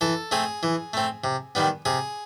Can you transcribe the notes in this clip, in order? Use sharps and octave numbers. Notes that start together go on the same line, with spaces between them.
E3 A4
A3 C4 G#4
E3
A3 C4
C3
D#3 G3 B3
C3 G#4